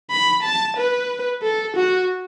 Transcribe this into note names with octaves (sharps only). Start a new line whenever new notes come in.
B5
A5
B4
A4
F#4